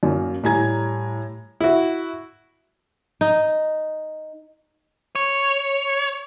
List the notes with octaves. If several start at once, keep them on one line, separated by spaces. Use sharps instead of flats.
F#2 A#3
A2 G3 G#5 A#5 G#6
E4 F#4
D#4
C#5